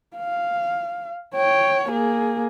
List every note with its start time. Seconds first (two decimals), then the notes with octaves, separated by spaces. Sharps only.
0.17 F5
1.35 C#5 G5
1.89 A#3 G#4